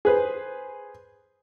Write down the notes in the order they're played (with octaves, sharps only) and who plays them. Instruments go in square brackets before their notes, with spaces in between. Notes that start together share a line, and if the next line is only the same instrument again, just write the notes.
[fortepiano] G#4 B4 C5